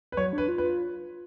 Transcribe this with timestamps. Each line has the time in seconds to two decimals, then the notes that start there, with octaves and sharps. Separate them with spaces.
0.12 B4
0.17 F#3 C#5
0.33 D4
0.38 B4
0.48 F4
0.58 B4
0.64 F4